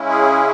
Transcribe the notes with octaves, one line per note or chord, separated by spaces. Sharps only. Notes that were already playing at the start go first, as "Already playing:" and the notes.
Already playing: C#3 G#3 C#4 E4
G#4